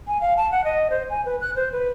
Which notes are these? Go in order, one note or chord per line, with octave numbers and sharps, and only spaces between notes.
G#5
F5
A5
F#5
D#5
C5
G#5
B4
F#6
C5
B4